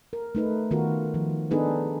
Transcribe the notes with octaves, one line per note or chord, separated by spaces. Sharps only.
A#4
A3 D#4 B4
D#3 B3 F4 F#4 A#4
D#3 F3
B3 D4 D#4 G#4 A4 B4